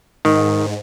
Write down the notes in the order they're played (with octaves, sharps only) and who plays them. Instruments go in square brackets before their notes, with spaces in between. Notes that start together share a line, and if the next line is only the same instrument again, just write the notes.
[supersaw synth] G#2 [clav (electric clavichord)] D#3